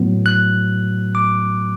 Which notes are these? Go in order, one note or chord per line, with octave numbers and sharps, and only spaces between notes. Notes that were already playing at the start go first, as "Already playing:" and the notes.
Already playing: A2 F#3 B3
F#6
D6